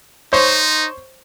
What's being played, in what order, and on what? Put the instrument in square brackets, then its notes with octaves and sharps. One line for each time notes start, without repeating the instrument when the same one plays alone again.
[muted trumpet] D#4 [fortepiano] C5 C#5